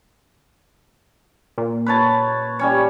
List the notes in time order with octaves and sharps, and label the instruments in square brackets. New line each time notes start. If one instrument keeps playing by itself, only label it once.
[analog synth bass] A#2
[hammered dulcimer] B4 C#5 A5
G3 C#4 C#5